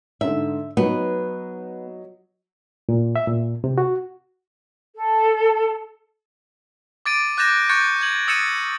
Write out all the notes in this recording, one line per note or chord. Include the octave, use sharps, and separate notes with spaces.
G#2 D3 E5
F#3 B3 D#4
A#2
E5
A#2
C3
F#4
A4
D6 A6 D7 D#7
D6 F#6 G6 A6 A#6 E7
C#6 F#6 G6 A6 C#7
G#6 F#7
D#6 E6 A6 C#7 D#7 E7